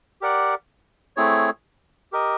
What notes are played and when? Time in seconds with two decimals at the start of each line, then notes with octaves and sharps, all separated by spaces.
0.21 G4 A#4 D5 F#5
1.17 A3 C4 E4 G#4 C#5
2.12 G4 A#4 D#5